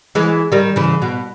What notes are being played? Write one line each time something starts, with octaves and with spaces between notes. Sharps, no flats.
E3 G#3
D#3 G3
C#3 E3
B2